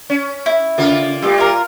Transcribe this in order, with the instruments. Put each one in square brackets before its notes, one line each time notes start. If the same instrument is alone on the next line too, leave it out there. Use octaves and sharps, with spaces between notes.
[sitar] C#4
[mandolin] E4
[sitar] C#3 A#3 F4
[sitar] G3 A#3 [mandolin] A3 F4
[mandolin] F4 A#4